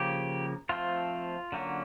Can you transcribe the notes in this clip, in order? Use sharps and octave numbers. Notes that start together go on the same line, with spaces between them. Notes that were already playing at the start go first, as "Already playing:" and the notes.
Already playing: C#3 F3 A#3 G4
F3 A3 C4 F4
D3 F#3 A#3 C#4